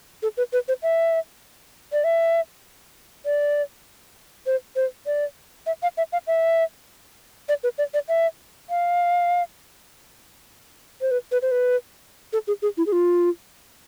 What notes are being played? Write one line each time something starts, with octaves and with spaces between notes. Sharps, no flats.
A4
B4
B4
C5
E5
D5
E5
D5
C5
C5
D5
E5
F5
E5
F5
E5
D5
B4
D5
D5
E5
F5
C5
B4
B4
C5
B4
A4
G#4
G#4
E4
G#4
F4